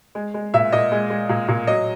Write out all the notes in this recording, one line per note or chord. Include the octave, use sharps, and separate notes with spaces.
G#3
G#3
A#2 E5
A#2 D#5
G#3
G#3
A#2
A#2
F#3 D#5